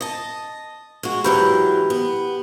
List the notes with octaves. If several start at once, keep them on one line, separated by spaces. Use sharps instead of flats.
D#5 A5
G#3 F#4
G#2 E3 F#3 G4 B5 G6
B3